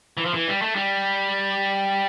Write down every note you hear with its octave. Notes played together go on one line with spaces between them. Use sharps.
E3
F3
E3
G3
A3
G3